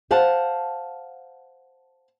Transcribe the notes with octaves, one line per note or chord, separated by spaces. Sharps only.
C5 F5 F#5 A5